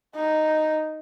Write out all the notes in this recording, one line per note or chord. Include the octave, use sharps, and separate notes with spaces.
D#4